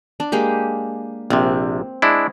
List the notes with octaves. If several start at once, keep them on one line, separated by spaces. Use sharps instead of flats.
D4
G#3 A#3 G4
A#1 C3 C4
G#3 D4 E4